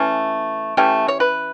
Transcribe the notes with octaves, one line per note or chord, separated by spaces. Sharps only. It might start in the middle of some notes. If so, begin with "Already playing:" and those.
Already playing: E3 A3 C#4
E3 A3 C#4 G4
C#5
B4